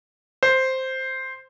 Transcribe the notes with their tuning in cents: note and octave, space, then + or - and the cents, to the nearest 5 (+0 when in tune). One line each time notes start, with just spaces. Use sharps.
C5 +0